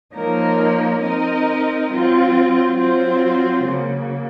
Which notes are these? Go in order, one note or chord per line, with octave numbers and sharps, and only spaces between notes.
F3 A#3 D#4 A#4 C#5
C4 D#4 A#4 D#5
F#3 C4 F4
F#3 C4 F4 C5
C#3 F#3 A#3